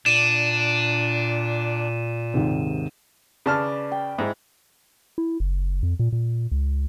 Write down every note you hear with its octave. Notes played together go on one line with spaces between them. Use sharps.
A#2 D4 D#7 E7
D#2 G#2 C3
C#3 B4 D5 A5 F6
G5
G#2 G#3 E4
E4
F#1
F2
A#2
A#2
C#2